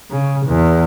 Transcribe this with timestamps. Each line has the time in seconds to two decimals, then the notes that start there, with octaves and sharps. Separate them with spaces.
0.11 C#3
0.47 E2